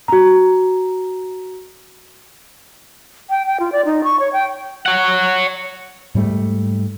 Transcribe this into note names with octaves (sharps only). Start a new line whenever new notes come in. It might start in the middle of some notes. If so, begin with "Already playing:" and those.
F#4 A#5
G5
G5
F4
D5
D#4
C#6
C#5
G5
C#5 F#5
G#2 G3 A3